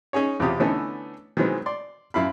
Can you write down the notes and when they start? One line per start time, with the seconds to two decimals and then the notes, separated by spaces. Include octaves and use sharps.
0.13 C#4 D#4 G#4 C#5
0.40 E2 C3 F4 G4 D#6
0.60 D3 E3 A3 B3 C#4 D#4
1.37 D#3 E3 F#3 G#3 B3 C4
1.66 D5 C6
2.14 F#2 E4 F5 B5